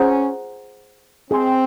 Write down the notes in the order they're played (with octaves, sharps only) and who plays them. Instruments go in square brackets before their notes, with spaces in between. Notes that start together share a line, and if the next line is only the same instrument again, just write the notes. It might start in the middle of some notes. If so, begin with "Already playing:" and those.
Already playing: [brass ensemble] C#4 [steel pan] G#4 C5 F#5 A#5
[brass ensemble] C4 [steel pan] G#4 D#5 G#5 C6